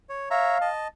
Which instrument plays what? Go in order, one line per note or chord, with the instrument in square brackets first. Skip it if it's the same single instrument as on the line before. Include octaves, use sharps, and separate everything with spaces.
[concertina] C#5
[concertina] C#5 E5 A#5 [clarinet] F5
[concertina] D#5 A5